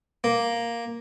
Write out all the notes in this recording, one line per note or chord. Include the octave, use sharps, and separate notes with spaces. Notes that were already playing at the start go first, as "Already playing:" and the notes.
A#3